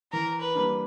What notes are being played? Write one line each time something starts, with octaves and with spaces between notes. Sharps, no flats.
E3 A#4
B4
G3 A#3 D4